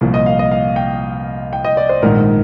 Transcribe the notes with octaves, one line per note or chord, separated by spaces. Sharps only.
C2 A#2 F3
D#5
F5
D#5
F5
G5
G5
D#5
D5
C5
A#1 G#2 D#3 A#4